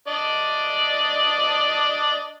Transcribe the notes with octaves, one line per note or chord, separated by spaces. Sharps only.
D4 D5 D#5